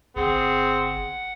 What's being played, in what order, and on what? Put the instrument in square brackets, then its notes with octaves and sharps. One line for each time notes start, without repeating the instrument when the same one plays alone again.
[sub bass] G1 [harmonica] C4 [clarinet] G#4 [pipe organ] F#5